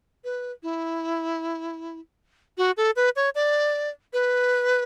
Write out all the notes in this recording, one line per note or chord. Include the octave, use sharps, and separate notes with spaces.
B4
E4
F#4
A4
B4
C#5
D5
B4